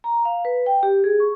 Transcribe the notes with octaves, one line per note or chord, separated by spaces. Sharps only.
A#5
F5
B4
G5
G4
G#4
C#6